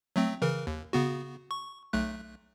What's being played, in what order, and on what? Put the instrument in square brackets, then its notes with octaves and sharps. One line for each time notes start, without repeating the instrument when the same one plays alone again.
[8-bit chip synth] F#3 A3 C4
C#3 E3 A#4
D#2
C#3 B3 F#4
C#6
B1 A3 F#6